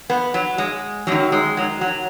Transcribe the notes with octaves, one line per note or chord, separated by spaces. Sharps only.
B3
F#3
G#3
F#2 D#3 F#3
G#3
F#3
F#3